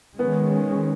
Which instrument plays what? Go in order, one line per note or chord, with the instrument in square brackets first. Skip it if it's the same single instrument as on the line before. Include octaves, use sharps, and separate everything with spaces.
[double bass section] D#3 G#3 C#4 [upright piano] B3